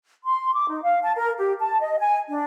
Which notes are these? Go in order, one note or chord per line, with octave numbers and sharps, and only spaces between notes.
C6
D6
D#4
F5
A5
A#4
G4
A5
D#5
G#5
D4